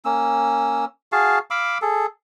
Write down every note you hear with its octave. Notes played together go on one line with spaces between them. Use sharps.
A#3 C#4 E6
F#4 G#4 F5 A5
F5 B5 D6 E6
G#4 A4